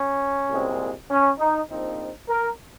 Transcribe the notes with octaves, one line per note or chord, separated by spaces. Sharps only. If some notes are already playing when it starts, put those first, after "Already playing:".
Already playing: C#4
C2 A#2 G#3 C4
C#4
D#4
A#1 A#2 F3 C4 D#4
A#4